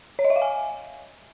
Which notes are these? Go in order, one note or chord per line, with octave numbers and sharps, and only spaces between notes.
C#5
D#5
E5
F5
G#5